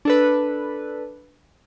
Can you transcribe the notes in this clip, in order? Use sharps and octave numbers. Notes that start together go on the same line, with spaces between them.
D4 A4 B4